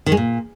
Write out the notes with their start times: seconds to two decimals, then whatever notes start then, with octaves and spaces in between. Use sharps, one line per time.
0.06 D#3
0.12 G#3
0.17 A#2